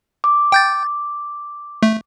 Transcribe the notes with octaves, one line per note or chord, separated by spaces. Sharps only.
D6
G5 G6 A6
A3